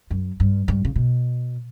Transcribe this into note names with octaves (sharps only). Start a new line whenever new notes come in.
F#2
G2
G2
C#3
B2